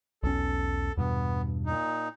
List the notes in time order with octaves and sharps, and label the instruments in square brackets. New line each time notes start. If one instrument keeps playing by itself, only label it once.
[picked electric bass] B1 E2 C#4 [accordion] A4
[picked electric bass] E2 G2 B2 [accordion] B3
[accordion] A#2 D#4